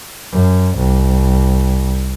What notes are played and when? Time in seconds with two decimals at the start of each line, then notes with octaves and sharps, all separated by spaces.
0.32 F#2
0.78 C2